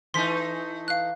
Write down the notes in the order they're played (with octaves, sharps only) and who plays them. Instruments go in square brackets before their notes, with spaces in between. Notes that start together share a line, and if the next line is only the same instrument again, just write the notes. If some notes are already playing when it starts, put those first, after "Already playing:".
[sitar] E3 A3 D#4 [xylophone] C6 B6
[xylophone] F5 F#6